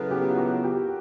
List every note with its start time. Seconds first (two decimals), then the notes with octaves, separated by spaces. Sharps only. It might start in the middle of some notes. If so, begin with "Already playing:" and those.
Already playing: C#3 F#3 B3 E4 A4 A#4
0.11 G4
0.28 F4
0.38 F#4
0.64 G4